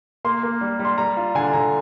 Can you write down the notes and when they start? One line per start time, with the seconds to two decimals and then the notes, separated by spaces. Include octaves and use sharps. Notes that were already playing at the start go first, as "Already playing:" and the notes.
0.24 A#3 C6
0.43 A#3
0.61 G3
0.79 G3
0.85 C6
0.98 G3 A#5
1.17 F4
1.35 D3 G#5
1.53 D3 A#5